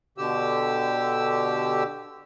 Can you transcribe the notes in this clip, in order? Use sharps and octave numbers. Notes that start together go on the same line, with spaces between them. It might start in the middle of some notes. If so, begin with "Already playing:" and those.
B2 D3 G4 E6